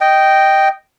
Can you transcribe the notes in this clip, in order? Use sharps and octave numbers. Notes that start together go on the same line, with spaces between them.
D#5 G5